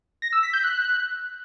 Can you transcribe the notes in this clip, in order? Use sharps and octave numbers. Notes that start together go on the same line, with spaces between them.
A#6
E6
B6
G6
F#6